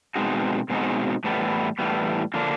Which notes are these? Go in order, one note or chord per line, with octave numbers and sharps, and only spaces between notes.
B2 G#3 C4 D#4 F#4
B2 G#3 C4 D#4 F#4
A2 E3 G3 B3
A2 E3 G3 B3
D3 F3 A#3 D4